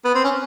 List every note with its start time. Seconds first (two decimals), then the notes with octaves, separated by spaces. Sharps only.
0.05 B3
0.15 C4
0.24 C#4